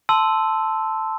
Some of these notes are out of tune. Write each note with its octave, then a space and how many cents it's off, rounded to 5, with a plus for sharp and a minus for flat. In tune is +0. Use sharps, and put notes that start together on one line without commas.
A5 +0 C6 -10 E6 -5